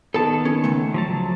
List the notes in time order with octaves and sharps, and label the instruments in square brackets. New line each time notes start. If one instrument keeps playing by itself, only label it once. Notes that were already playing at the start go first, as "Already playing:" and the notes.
[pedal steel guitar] D#3 B3 [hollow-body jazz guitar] A4 A5
[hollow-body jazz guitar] C#4
C#2 A3
[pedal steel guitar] F3 F#3 A5